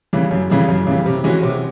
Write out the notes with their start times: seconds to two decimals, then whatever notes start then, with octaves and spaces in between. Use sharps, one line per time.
0.13 C#3 E3 G3
0.31 F#2
0.50 C#3 E3 G3
0.69 F#2
0.87 C#3 E3 G3
1.06 C3
1.24 E3 G#3 C#4 F#4
1.43 C3